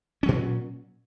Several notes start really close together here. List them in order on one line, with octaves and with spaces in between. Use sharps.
C#4 F#3 A#2